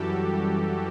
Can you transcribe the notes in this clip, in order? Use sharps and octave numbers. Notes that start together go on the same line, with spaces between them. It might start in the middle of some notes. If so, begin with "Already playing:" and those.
Already playing: F#2 E3 G3 F#4 G4 A4
G4